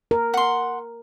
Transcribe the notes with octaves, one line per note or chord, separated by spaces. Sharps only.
A#4
F#5 C6